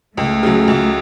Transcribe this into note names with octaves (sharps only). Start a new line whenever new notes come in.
C#2 A3
C#3 F#3
C#2